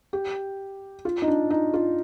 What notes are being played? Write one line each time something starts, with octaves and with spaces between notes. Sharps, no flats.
G4
F4
D#4
D4
D#4
F4